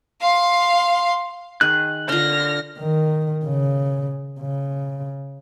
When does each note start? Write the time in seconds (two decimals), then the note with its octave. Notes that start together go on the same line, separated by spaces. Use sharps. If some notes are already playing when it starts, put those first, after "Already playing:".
0.21 F5 C6
1.61 D#3 G#4 F#6
2.09 D3 F4 F6 A#6
2.79 D#3
3.45 C#3
4.40 C#3